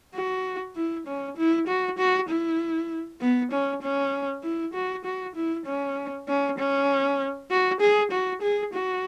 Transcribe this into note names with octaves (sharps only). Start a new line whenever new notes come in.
F#4
E4
C#4
E4
F#4
F#4
E4
B3
C#4
C#4
E4
F#4
F#4
E4
C#4
C#4
C#4
F#4
G#4
F#4
G#4
F#4